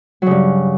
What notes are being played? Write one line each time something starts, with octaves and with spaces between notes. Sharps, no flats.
G2 C#3 F#3